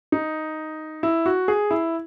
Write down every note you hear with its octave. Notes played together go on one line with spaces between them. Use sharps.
D#4
E4
F#4
G#4
E4